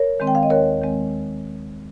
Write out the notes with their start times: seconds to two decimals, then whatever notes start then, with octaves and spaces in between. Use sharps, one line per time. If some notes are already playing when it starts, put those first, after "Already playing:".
Already playing: A#4 C#5
0.20 D#3 G#3 C4
0.27 G5
0.35 F5
0.43 D#5
0.50 D#2 A#4 C#5
0.81 D#3 G#3 C4